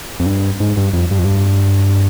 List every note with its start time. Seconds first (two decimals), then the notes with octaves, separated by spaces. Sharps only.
0.20 F2
0.26 G2
0.60 G#2
0.77 G2
0.93 F2
1.11 G2
1.19 F2
1.25 G2